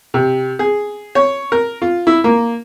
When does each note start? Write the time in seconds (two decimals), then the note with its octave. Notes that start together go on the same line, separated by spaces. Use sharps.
0.14 C3
0.59 G#4
1.15 C#5
1.52 A#4
1.82 F4
2.07 E4
2.24 A#3